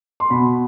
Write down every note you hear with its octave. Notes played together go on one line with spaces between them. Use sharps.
C6
B2 B5